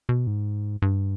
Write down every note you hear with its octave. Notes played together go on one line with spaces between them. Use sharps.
B2
G#2
G2